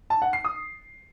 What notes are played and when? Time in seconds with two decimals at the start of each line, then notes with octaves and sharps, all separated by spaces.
0.10 A5
0.22 F#5
0.33 C7
0.45 D#6